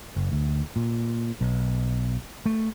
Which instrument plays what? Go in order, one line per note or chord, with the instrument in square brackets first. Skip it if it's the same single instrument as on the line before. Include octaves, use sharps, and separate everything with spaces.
[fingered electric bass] F#1
D2
A#2
B1
A3